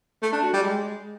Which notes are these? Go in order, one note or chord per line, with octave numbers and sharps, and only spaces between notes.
A3
D4
F#4
G3
G#3